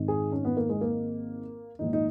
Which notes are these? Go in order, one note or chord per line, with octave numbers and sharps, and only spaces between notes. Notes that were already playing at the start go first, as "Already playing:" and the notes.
Already playing: G#1 G#2 D#3
G#4
C#4
B3
A#3
G#3
A#3
A#1 G#2 D#3 D#4
D#4